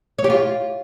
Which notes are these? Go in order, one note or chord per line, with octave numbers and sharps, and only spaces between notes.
C#5
G4
F4